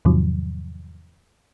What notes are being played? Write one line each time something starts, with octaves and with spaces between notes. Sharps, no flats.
E2 G#2 C3 D#3 F3 F#3